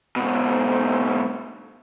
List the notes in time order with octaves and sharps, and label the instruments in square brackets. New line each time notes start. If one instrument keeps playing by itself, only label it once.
[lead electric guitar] G#2 B2